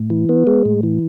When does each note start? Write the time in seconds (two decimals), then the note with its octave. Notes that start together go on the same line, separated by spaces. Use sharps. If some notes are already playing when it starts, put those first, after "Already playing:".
Already playing: A2
0.10 E3
0.29 B3
0.47 G#3
0.65 A2
0.83 E3